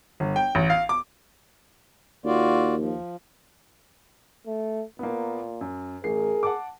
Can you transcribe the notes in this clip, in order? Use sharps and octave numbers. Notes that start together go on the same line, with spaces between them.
G1
G5
A1
F5
D6
D#2 F4 F#4 D5
F3
A3
A#2 A#3 B3
F#2
A1 G#4 A#4 C7
F#5 A5 D6